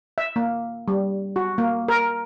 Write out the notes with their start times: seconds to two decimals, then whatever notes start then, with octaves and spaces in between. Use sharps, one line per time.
0.18 E5
0.36 A#3
0.88 G3
1.36 F#4
1.58 A#3
1.88 A#4